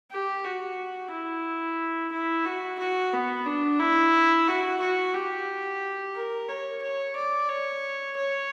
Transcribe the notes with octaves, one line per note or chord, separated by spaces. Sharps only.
G4
F#4
E4
E4
F#4
F#4
B3
D4
E4
F#4
F#4
G4
A#4
C#5
C#5
D5
C#5
C#5